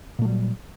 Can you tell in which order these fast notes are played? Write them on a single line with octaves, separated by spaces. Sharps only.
A#2 A3 F#3 G3